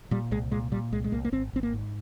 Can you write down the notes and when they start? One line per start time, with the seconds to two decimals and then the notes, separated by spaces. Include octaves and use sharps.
0.11 A#2 G3
0.31 C2 G#3
0.51 A#2 G#3
0.72 A#2 G3
0.92 C2 G#3
1.04 G#3
1.12 C2 A#3
1.25 A#3
1.32 G#1 C4
1.53 G#1 C4
1.63 A#3
1.73 G#2